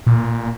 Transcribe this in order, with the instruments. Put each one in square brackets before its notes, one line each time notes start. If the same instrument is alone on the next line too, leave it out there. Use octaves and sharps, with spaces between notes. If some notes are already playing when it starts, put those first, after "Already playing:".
[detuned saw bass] A#2